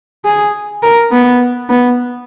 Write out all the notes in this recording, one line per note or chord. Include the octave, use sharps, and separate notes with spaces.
G#4
A#4
B3
B3